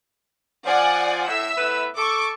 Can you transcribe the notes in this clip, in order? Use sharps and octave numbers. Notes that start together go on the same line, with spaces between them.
F3 F4 D5 F#5 G#5
A2 E5 E6
A2 B3 B4
A4 C#6 D6